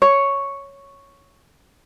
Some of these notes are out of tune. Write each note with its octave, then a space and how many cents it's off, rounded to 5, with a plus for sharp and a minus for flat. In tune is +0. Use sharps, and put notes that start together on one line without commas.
C#5 +0